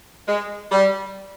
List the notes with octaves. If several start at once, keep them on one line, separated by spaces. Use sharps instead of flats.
G#3
G3